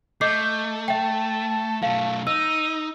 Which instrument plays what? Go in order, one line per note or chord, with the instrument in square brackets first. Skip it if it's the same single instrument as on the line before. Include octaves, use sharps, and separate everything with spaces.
[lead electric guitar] A3 [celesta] D#5 D6 C7 [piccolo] G6
[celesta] E5 G5 [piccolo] A5
[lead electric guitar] B1 A3 [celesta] F5
[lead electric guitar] D#4 [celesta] E6 [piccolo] D#7